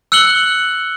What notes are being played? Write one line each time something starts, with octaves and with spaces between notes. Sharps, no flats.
E6 F#6 C#7 F#7 G7